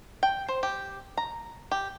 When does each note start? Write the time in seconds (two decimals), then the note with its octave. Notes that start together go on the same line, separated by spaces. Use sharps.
0.23 G5
0.48 C5
0.63 G4
1.17 A#5
1.71 G4